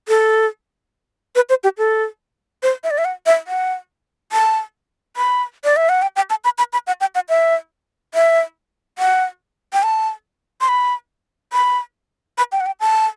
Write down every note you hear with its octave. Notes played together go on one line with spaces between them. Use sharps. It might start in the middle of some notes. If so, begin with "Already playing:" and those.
A4
B4
C5
G4
A4
C5
E5
D5
E5
F#5
E5
F#5
A5
B5
D5
E5
F#5
G5
G5
A5
B5
B5
B5
F#5
G5
F#5
E5
E5
F#5
G5
A5
C6
B5
B5
B5
G5
F#5
G5
A5